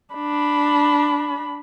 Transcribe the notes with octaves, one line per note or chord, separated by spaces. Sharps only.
D4 B5